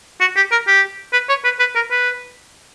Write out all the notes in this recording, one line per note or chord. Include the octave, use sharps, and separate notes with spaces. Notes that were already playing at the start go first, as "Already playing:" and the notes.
F#4
G4
A#4
G4
B4
C#5
B4
B4
A#4
B4